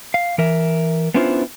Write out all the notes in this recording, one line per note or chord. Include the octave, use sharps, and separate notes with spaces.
F5
E3 A#4 E5
B3 C#4 D4 E4 F4 C5